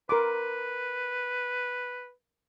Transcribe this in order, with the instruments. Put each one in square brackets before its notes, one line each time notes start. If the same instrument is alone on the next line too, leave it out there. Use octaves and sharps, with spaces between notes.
[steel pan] A#4 C6 D6 [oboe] B4